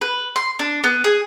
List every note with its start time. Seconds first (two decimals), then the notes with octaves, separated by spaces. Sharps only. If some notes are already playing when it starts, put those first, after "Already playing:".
0.01 B4
0.36 C6
0.59 D4
0.84 B3
1.04 G#4